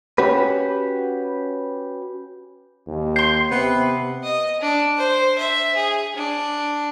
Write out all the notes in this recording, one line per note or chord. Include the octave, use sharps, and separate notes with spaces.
C#4 F#4 G4 B4
D#2
C6 G6 C7
C3 B3
D#5
D4
C5
E5
G#4
D4